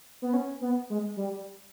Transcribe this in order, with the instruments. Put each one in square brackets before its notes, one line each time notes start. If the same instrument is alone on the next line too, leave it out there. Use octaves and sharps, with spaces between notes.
[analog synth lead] B3
C#4
B3
G#3
G3